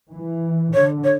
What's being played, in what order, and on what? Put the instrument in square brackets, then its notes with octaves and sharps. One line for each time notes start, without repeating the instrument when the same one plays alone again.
[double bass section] E3
[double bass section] D3 [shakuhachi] C#5
[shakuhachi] C#5